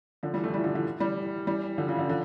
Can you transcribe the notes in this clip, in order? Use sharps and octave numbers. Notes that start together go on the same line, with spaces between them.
D3 F3
E3 G3
F3 A3
E3 G3
D3 F3
D3 F3
E3 G3
E3 G3
D3 F3
C#3 E3
D3 F3
D3 F3